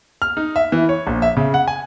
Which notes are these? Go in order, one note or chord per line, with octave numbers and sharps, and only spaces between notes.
F6
D#4
E5
E3
C#5
A#1
E5
C#3
F#5
G#5